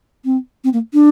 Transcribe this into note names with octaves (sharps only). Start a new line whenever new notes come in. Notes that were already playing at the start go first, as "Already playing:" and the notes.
C4
C4
A#3
D4